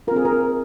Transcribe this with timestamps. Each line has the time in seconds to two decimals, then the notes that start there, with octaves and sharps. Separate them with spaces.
0.07 C4 F4 A#4
0.16 G#4
0.25 A#4